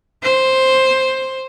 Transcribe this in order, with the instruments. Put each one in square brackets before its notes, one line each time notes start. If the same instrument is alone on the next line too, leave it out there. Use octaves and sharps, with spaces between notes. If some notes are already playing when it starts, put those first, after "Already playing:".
[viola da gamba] C5